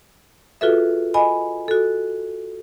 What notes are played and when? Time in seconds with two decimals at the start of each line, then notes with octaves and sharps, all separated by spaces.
0.61 F4 F#4 G#4 A4 B4 E5
1.14 D#5 G#5 B5
1.68 F#4 A4